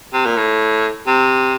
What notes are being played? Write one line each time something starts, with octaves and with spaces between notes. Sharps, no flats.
C3
A#2
A2
C3